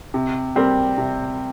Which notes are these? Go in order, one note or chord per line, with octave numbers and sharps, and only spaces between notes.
C3
G3 C4 G4 A#4
C3